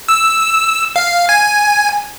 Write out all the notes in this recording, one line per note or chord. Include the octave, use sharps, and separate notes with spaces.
E6
F5
G#5